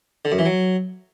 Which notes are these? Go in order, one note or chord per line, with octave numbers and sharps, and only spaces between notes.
D3
F#2
E3
F#3